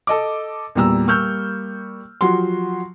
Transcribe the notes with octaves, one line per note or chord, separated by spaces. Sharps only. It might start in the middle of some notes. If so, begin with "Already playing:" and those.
A4 D#5 D6
E2 A#2 G3 A#5 E6
G3 A#3 C#6 E6 F6 G6
F3 F#3 F#4 G4 C6